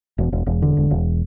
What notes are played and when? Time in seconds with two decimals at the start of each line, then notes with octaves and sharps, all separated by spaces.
0.18 E1
0.32 E1
0.46 E1
0.62 D3
0.77 E1
0.91 E1